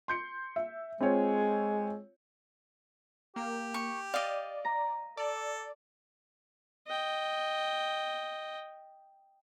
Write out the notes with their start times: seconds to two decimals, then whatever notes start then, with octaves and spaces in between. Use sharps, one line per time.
0.08 C6 G6 C#7
0.56 E5
1.00 G#3 C4 F4 C#5
3.36 A#3 G4
3.74 C#6
4.14 D5 D#5 F5
4.65 A#5
5.17 A4 D5
6.87 D#5 G5